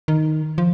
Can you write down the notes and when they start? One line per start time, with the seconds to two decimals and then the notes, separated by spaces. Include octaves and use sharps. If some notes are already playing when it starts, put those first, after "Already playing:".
0.08 D#3
0.58 F3